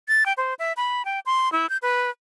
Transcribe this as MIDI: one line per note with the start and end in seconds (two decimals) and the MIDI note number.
0.08 0.24 93
0.26 0.33 79
0.37 0.54 72
0.59 0.73 76
0.77 1.05 83
1.05 1.20 79
1.26 1.51 84
1.52 1.69 64
1.70 1.77 91
1.82 2.10 71